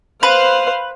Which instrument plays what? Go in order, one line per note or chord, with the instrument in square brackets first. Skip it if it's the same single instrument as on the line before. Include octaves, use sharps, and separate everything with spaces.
[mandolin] B4 [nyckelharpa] C5 F5